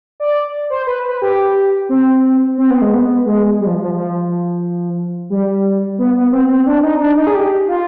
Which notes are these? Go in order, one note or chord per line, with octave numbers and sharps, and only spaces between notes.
D5
C5
B4
B4
G4
C4
C4
B3
G#3
B3
G#3
G3
F3
F3
F3
G3
B3
B3
C4
C4
D4
D#4
D4
D#4
G#4
G4
F4